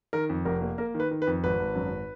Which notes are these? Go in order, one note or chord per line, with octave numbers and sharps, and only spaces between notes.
D#3 A#4
F2
F1 A#4
A#3
A#3 A#4
D#3
B4
D#3
B4
F2
G#1 B4
G#1
F#2